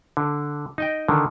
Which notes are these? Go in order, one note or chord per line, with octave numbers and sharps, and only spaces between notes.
D3
D#4 D#5 G5
D3 D#3